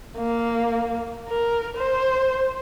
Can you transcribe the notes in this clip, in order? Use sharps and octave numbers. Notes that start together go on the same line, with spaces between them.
A#3
A#4
C5